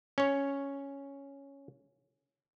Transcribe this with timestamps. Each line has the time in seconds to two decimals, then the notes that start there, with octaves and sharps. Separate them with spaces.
0.18 C#4 C#5